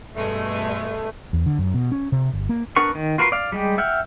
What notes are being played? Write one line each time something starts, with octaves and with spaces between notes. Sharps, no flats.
G2 B2 G#3 A3
E2
D3
F#2
B2
C#4
C3
G1
A#3
B3 D4 A#4 F#5 C#6
D#3
F4 F#4 A#4 B4 C6
D5 F5
G3 G#3 G4
E5 F#5 G5 F6